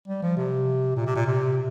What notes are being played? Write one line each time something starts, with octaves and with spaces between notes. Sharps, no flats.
G3
F3
C3
A#2
C3
A#2
C3